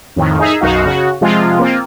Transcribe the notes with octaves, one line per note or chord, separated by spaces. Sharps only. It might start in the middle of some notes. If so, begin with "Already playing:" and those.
F2 A2 D#3
D#4 G#4 D#5 E5
B1 F#2 D#4 F#4 F5
C#3 F#4
C3 F3 G#3 F4
A#3 C4 F4